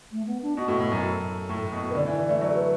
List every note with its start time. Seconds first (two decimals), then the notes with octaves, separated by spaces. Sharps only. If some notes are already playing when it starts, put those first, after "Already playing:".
0.11 A3
0.27 B3
0.42 D4
0.57 B2 F#4
0.68 A2
0.80 A2
0.92 F#2
1.03 A4
1.49 A2
1.72 B2
1.90 B4
1.95 D3 D5
2.06 E3
2.18 E3
2.29 A3
2.41 F#3 D5
2.50 A4
2.56 B4